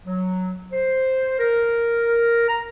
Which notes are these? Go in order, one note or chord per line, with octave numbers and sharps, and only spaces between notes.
F#3
C5
A#4
A#5